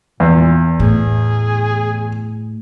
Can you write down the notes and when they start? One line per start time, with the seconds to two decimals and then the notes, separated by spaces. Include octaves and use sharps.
0.20 E2 A#2
0.80 A2 G#4